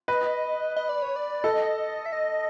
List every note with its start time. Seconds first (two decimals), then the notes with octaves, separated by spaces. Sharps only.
0.08 B4 D#5
0.76 D#5
0.89 D5
1.02 C#5
1.16 D5
1.44 A4 D#5
2.06 E5
2.12 D#5